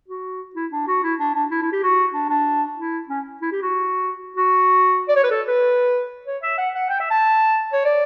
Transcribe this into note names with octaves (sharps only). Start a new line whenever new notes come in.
F#4
E4
D4
F#4
E4
D4
D4
E4
E4
G4
F#4
D4
D4
E4
C#4
E4
G4
F#4
F#4
D5
C#5
B4
A4
B4
C#5
E5
F#5
F#5
G5
E5
A5
C#5
D5